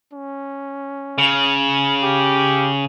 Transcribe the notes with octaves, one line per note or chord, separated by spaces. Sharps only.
C#4
C#3
G4